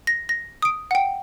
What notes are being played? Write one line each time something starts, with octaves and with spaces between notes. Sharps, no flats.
A#6
A#6
D#6 D7
F#5 G5